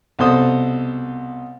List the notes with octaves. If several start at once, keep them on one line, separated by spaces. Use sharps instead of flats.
C2 B2 A4 C5 D#6